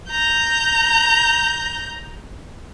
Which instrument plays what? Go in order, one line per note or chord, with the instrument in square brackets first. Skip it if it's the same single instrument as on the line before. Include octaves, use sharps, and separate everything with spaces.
[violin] A#5 G6